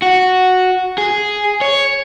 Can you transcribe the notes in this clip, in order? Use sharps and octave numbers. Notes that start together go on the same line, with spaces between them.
F#4
G#4
C#5